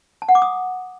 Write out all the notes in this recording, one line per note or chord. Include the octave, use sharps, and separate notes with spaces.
A5
F#5
D6
D#6